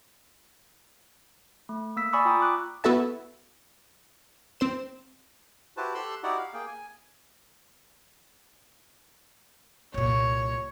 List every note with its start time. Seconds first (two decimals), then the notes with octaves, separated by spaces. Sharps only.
1.69 A3
1.96 A#3 E6 B6
2.13 D5 G#5 B5 C#6 D#6 E6
2.25 F4 G5 A#5 D#6
2.40 D6 F#6
2.84 B3 E4 F#4 A4 E5 A5
4.60 C4 C5 E7
5.77 E4 F#4 G4 B4 C5 A5
5.95 G4 A4 C6 E6 F#6
6.23 D#4 E4 F#4 G4 D5 F#5
6.38 F5
6.54 A#3 G#4 G5
6.67 G#5
9.94 C2 A#2 C#5